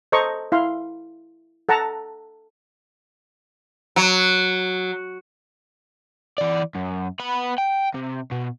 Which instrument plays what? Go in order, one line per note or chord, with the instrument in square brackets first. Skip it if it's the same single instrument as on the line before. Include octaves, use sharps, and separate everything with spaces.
[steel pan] A4 C5 D#5 A#5 C#6
E4 F5 C6
A4 F#5 A5 A#5
[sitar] F#3
[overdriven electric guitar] E3 D5
F#2
B3 B5
G5
C3
B2